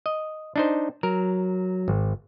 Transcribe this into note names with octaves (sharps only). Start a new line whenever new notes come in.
D#5
D4 D#4 C5
F#3 A#4
G#1